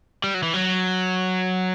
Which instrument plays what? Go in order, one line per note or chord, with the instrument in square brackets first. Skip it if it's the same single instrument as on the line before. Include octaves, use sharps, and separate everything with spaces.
[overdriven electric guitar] G3
F#3
E3
F#3